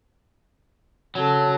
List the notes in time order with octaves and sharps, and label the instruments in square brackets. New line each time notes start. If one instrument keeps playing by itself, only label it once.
[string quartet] C#3 A4 [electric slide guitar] F#3